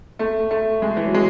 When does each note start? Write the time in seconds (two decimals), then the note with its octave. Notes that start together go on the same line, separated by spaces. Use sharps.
0.19 A3
0.51 A3
0.82 G#3
0.97 E3
1.06 F#3
1.14 G#3